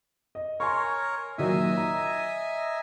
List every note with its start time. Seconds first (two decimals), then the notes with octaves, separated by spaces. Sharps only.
0.35 D#5
0.60 A#4 C#5 G#5 C6 C#6
1.38 A#2 D#3 F#3 D#5 E5 G#5
1.77 A#5